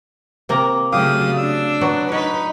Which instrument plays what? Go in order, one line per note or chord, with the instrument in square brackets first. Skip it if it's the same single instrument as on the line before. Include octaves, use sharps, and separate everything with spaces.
[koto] C3 A#3 A#5
[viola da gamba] C#3 F#3 A3 [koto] G4 [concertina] F5 D#6
[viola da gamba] D4 [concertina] E6
[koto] F#3 B3 F#4
[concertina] D#4 [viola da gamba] B4 [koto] C#5